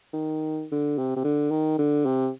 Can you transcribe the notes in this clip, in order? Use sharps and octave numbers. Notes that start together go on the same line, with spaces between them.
D#3
D3
C3
C3
D3
D#3
D3
C3